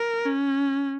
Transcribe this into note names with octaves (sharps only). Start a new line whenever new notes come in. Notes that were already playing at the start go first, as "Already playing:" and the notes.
Already playing: A#4
C#4